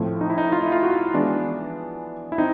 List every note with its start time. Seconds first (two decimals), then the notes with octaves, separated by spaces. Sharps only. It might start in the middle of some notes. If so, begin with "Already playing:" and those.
Already playing: A2 F3 A3 C4
0.21 D#4
0.30 E4
0.38 D#4
0.52 F4
0.63 E4
0.72 F4
0.83 F#4
1.14 E3 G#3 B3 D4
2.32 E4
2.38 C4 D#4